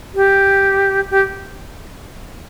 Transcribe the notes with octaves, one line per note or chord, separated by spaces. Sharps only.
G4
G4